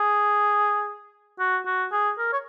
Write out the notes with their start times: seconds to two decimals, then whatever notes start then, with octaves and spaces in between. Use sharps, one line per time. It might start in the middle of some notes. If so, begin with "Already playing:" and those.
Already playing: G#4
1.39 F#4
1.66 F#4
1.92 G#4
2.19 A#4
2.33 C#5